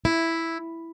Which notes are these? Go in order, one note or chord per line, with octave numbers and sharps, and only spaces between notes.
E4